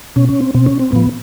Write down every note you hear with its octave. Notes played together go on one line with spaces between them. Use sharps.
B2 C#4
C#4
C4
B2 C4
C#4
C4
A2 F3 B3